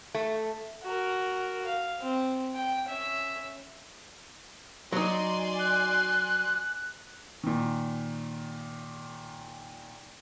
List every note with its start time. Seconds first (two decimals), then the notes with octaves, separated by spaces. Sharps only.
0.14 A3
0.83 F#4 A#4
1.66 F5
2.00 C4
2.55 G5
2.87 C#4 E5
4.92 F#3 D#4 D5 G#5 C6
5.59 F#6
7.44 A#2 D#3